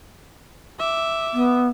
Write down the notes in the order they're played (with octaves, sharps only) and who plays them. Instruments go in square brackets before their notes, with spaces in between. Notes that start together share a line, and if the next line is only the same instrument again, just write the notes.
[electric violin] E5 D6
[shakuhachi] B3